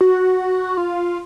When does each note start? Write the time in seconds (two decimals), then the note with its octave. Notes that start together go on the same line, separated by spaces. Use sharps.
0.01 F#4
0.77 F4